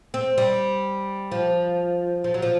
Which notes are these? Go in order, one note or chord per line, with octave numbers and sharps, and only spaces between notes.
C4
G3
F3
F3
F#3
F3